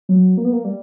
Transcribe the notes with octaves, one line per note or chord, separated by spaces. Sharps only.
F#3
A#3
B3
A#3
G3